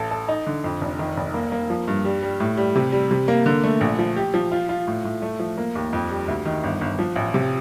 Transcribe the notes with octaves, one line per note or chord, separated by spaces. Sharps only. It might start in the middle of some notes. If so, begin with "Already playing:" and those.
Already playing: A1 A4
A4
D#4
D3
F2
F1
D#3
F1
A#3
A#3
F3
G2
G3
G3
A2
G3
C3
G3
C3
A#3
D3
A3
A#1
F3
G4
F3
F4
F4
A2
A2
A3
F3
A#3
D#2
F2
G3
D2
D#3
G1
G1
F3
A1
C3